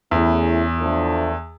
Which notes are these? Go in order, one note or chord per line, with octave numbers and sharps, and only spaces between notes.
E2 A3 C#4 E4 G#4
A2 F3 A3 D4